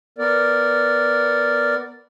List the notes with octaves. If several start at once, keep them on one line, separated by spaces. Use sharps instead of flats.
B3 A#4 D5